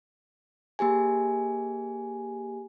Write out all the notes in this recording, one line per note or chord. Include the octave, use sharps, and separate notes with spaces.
A#3 G4 G#4 G#5